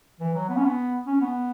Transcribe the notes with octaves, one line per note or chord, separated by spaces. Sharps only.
E3
F#3
B3
C#4
B3
C#4
B3